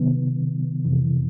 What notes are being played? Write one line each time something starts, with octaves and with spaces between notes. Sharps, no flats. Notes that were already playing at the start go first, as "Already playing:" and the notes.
Already playing: C3 D#3 F#3 B3
F2 C3 E3